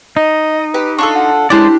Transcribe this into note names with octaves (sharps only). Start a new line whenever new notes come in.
D#4 D#5
G4 B4
D4 F4 A4 C#6
F#5
G#3 C#4 D4 E4 G4 C5 D5